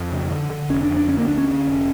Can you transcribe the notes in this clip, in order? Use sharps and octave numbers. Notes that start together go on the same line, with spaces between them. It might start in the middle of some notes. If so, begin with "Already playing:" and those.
Already playing: F2
C#3
D3
D3
F1 C#4
D4
F2
D4
D3 C#4
A#3
D2 D4
C#4
D3
F1